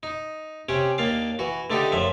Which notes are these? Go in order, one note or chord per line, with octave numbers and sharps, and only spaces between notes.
D#4
C3 C#4 G4
D#2 A#3 D4 F5
E3 F#4
D3 A3 D4 D#4 G4
F#2 F3 E5